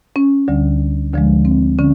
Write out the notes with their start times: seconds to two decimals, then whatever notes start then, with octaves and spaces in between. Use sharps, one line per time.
0.16 C#4
0.48 D2 D3 G3
1.13 D2 D3 F3 G#3
1.45 C4
1.78 D3 C#4